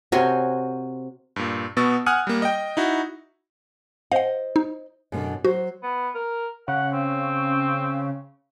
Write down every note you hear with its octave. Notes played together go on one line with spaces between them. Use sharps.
C3 F#4 A#4 C5 C#5 G#5 C6
G2 A#2
B2 B3 C#6 E6 A6
F#5 G#5 D#6 F6 F#6
G3 A#3
D#5 G5
D#4 E4 F#4
C5 D#5 F5 F#5
D#4
F#2 B2 D3
F#3 F#4 C5
B3
A#4
C#3 F#5
C4